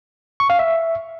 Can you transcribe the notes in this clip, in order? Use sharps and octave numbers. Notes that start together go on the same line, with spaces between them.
C#6
F5
E5